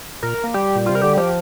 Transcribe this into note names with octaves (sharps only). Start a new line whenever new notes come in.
A#2 A#4
A#3
G3 G4
A#2
C3 F4
A#4
D3 G4
F3 G4